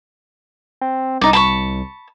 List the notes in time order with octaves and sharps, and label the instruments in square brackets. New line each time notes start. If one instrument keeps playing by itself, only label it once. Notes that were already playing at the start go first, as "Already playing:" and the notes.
[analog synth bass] C4
[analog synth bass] C2 [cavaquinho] D#4 D5
[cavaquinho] A5 B5 C#6